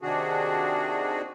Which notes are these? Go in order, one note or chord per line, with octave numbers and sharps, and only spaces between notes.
C3 D#3 D4 F#4 G#4